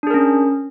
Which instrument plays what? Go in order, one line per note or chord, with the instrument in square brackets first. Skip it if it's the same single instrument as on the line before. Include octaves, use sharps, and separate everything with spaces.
[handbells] D4
G#4
A#4
C#4